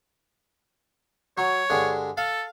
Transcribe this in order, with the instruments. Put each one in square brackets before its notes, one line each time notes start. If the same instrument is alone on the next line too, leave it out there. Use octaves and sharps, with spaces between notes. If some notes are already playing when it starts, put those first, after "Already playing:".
[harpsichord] F#3 [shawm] C#5
[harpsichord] G2 D3 G#3
[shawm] A4 [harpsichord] F5